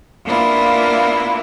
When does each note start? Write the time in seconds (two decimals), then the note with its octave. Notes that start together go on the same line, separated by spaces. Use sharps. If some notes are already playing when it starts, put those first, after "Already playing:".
0.25 A#3 B3 D4 E4 F4